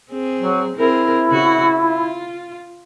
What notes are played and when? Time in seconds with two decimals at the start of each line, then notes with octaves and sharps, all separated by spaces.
0.10 C4 G#4
0.40 F#3
0.76 C4 E4 G#4 A#4
1.28 C#3 F#4
1.78 F4